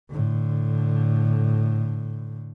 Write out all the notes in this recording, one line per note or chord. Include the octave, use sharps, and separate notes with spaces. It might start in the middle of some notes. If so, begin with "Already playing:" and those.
A2 D3